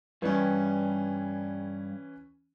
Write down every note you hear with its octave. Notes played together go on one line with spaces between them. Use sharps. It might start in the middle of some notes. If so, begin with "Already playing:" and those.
G2 E3 G3 C#4